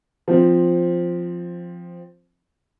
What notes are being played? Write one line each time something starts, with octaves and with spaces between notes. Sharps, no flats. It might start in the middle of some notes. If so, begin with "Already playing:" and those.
F3 C4